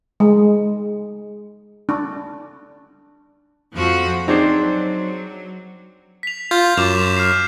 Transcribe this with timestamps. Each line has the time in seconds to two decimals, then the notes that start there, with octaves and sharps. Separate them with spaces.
0.20 G#3
1.89 D4
3.75 F2 F3 F#4
4.28 F#3 C4 D4 D#4 G#4 C5
6.23 B6 F7
6.51 F4 G6
6.77 F#2 D6 E7 F7
7.17 F6 C7